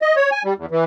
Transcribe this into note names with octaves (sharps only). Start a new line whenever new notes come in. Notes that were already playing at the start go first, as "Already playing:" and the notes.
D#5
C#5
G#5
G3
E2
E3